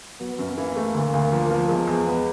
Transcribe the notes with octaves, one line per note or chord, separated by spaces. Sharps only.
F#3 B3
F#2
E3 A#3
A3
D2
D2
F3
F3
E2 G#3
E2
B3